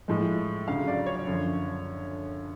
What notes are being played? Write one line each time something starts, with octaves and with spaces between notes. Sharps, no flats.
A2 F3 G#3
D2 C#3 F#3 F5
D5
C#5
F#2 D3 F3